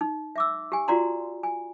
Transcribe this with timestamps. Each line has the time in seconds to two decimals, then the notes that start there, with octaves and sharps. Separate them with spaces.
0.01 D#4
0.36 E5 D6 E6
0.72 G4 G#5
0.88 F4 F#4 D5 F#5 A#5 C6
1.43 G#5